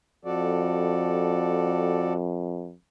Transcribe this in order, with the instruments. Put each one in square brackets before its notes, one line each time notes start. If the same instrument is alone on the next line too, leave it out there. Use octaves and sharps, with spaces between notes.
[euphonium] F2 [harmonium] F#4 A4 D5